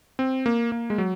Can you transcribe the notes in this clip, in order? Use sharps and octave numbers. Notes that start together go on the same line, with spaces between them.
C4
A#3
A#3
G#3
F#3